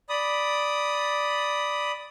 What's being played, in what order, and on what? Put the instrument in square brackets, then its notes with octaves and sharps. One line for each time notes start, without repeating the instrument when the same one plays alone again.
[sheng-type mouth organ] D5 B5 D#6